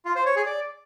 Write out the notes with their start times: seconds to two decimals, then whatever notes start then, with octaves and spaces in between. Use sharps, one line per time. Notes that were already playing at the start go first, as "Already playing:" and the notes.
0.05 F4
0.16 C5
0.26 C#5
0.36 G#4
0.46 D5